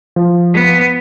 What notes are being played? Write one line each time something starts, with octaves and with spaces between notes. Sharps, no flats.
F3
B3